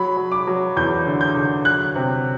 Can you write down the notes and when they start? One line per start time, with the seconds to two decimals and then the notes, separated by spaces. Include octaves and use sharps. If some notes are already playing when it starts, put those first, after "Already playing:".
Already playing: F#3 B5
0.17 F#3
0.32 D6
0.47 F#3
0.77 E2 G6
1.06 D3
1.21 G6
1.36 D3
1.65 F#3 F#6
1.96 C3